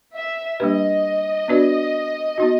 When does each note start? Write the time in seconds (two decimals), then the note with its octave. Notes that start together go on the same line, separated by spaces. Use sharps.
0.15 E5
0.60 G3 A#3 D4 G4 B4 D#5
1.48 B3 D4 F#4 B4 D5
2.38 B3 D#4 F#4